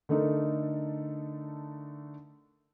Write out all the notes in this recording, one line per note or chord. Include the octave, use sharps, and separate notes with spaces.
D3 A3 D#4 A4 A#4